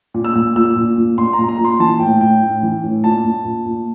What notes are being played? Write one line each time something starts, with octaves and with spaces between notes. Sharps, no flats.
A#2
E6
A#2
A#2 E6
A#2
A#2
A#2 C6
A#5
A#2
A#5
A#2
C6
E3 A5
A2 G5
A2 G5
A2
E3
A2
A#2 A5
A#2
A#2
A#2